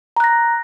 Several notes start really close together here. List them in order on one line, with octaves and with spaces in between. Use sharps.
A#5 F#6 A#6